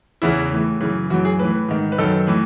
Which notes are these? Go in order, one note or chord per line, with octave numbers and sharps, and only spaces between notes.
E2 C#3 E3 E4
A2 E3
F#2 C#3 E3
F#2 E3 F#4
G#4
A2 E3 B4
G#2 D#3
B4
F#2 D#3 A4
A2 E3